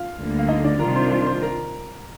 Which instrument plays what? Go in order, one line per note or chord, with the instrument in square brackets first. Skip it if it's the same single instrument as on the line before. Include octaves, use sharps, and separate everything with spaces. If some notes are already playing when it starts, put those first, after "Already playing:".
Already playing: [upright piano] F4 F5
[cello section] D2 D3 G3 A#3
[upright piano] F5
D#4 D#5
D4 D5
[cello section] C3 D#3 G3 D4 F4 [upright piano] A#4 A#5
[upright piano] C5 C6
C5 C6
C5 C6
A#4 A#5